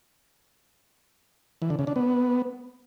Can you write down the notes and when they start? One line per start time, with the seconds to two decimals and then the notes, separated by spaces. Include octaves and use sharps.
1.62 E3
1.70 D3
1.79 C#3
1.87 D4
1.96 B3